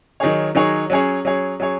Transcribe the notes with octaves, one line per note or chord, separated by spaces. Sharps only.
D#3 F#3 D#4 G#4 C#5
D#3 F#3 D#4 G#4 C#5
F#3 C#4 G#4 C#5
F#3 C#4 G#4 C#5
F#3 C#4 G#4 C#5